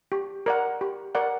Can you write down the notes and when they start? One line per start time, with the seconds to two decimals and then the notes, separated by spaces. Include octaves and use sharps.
0.12 G4
0.46 A#4 D5 F#5
0.81 G4
1.15 A#4 D5 F#5